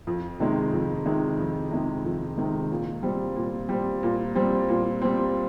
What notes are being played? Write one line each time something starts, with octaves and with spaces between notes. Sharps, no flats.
F2
C3 D#3 G#3
F2
C3 D#3 G#3
F2
C3 D#3 G#3
F2
C3 D#3 G#3
A#2
G3 C4
A#2
G3 C4
A#2
G3 C4
A#2
G3 C4